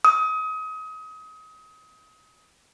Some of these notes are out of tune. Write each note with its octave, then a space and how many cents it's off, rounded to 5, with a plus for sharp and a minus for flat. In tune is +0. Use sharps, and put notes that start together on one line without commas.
D#6 +30